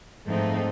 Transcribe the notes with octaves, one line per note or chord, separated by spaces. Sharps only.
G#2 F3 A3 C4 D#4